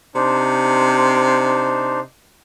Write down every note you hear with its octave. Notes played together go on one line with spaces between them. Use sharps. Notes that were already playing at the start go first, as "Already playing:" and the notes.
C3 D4 D#4 C5